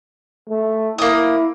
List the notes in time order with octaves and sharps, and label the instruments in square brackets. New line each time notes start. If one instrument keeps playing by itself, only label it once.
[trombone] A3
[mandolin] A#3 D#6 [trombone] E4